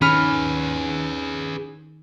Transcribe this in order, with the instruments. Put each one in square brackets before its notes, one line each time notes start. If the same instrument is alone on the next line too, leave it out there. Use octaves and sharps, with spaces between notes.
[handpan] D#3 [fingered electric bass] C#4 [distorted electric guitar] G#4 B4 [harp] B5 F6 C#7